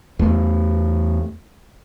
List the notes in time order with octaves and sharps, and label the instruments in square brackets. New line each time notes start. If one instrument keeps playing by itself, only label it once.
[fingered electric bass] E2 A3